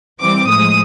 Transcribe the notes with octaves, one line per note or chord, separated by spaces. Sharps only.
E3 G3 C4 D6
A2 F3 G#3 D#6